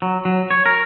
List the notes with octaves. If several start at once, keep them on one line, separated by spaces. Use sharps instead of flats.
F#3
F#3
C#5
A#4